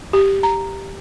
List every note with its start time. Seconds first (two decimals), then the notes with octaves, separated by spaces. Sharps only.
0.13 G4
0.43 A#5